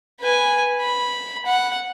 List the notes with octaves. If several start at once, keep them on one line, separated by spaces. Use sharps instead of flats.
B4 G#5
B5
F#5